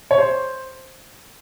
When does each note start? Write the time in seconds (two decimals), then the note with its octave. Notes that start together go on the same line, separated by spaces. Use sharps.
0.11 C#5
0.18 C5